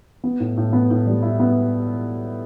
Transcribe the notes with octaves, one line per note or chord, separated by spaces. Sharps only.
B3
A2
A2
B3
A2
G3
E4
B3